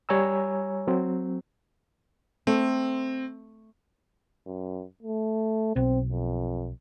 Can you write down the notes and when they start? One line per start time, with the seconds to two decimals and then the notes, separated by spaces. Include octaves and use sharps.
0.09 G3 C#5 G#5 A#5 E6
0.87 F#3 C4
2.47 A3 C4
4.46 F#2
5.03 A3
5.76 B1 C4
6.11 F2